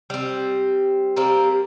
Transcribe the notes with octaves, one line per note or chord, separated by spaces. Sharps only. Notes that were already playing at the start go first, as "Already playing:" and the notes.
G3 C4
G3 A#3 C4